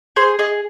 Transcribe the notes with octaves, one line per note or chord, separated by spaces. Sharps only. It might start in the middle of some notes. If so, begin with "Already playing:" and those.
G#4 C5
G#4 D#5